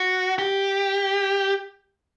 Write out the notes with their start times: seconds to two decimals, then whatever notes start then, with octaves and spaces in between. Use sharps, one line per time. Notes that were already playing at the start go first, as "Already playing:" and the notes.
Already playing: F#4
0.39 G4